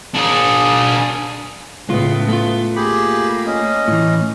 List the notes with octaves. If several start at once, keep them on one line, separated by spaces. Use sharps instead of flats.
D4 G#4
C#2 A2 C#3 G#3 B3 F4
A3 F4
A#3 G4 G#4 B5
C#4 D#5
A2 E3